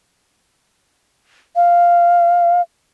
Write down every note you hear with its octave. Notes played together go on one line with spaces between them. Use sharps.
F5